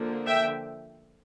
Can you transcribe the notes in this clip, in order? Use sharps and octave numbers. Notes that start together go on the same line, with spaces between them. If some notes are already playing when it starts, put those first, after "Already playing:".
Already playing: D3 F3 A#3
E5 G5